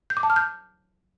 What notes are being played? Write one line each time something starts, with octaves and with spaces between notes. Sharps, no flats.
G6
D6
A5
F6
G6